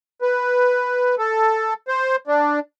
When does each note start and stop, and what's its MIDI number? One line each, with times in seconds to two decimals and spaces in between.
0.22 1.15 71
1.18 1.74 69
1.88 2.16 72
2.27 2.60 62